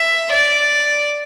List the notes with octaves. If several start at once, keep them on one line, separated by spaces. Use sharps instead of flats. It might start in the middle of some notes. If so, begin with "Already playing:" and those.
Already playing: E5
D5